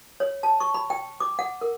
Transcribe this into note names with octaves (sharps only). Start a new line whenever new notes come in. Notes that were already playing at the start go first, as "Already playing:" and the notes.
C#5
A5
C#6
B5
G5
D6
F#5
A#4